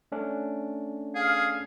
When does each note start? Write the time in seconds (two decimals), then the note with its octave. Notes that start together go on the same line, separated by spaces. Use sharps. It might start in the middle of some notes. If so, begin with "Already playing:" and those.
0.12 A3 C#4 D4
1.15 G#4 F5